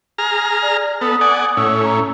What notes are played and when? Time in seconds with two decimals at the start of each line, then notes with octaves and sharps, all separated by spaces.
0.18 G#4 A#5 F6
0.63 D5
1.01 B3 A4 D#6
1.21 D5 F#5 G#5
1.57 A2 C#4 E6
1.84 A#5